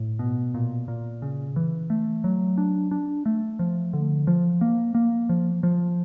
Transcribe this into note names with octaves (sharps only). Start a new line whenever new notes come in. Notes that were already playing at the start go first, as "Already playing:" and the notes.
Already playing: A2
B2
A#2
A#2
C#3
E3
A3
F#3
D4
D4
A3
F3
D3
F3
A#3
A#3
F3
F3